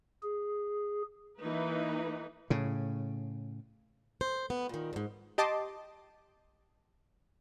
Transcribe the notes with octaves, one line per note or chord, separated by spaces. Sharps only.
G#4
E3 A#3 D#4 B4
A2 C#3
C5
B3
A#2 D#3
E2 G#2
G4 D#5 A5 C6 D6